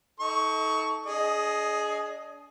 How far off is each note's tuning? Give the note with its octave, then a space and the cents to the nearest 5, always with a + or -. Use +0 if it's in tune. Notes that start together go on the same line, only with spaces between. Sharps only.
D#4 +35 A4 -10 C#6 +10
D4 -35 G#4 +15 D#5 +0